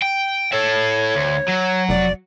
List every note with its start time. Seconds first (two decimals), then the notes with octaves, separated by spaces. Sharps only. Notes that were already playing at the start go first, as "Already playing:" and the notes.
0.02 G5
0.52 E4 A4 C#5
1.15 D2
1.48 F#3
1.89 F1 D5